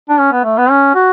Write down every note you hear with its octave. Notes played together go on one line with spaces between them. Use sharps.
D4
C#4
B3
A3
B3
C#4
F#4